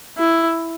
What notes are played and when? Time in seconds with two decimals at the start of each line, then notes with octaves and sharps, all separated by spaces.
0.18 E4